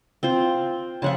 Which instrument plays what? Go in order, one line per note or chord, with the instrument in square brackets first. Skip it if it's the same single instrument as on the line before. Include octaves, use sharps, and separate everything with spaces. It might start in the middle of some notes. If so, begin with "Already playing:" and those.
[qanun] C4 F4 C5
[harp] C#3 F3 [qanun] E5 F#5 A5